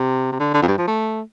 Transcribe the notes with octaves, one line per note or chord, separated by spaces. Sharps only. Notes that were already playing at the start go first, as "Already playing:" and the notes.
Already playing: C3
C3
D3
D3
F2
G2
F3
A3